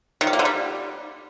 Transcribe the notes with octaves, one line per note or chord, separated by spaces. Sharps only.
D#3
G3
A#3
D3
G3